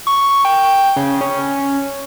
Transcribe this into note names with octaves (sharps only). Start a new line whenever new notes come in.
C#6
G5
C#3
C#4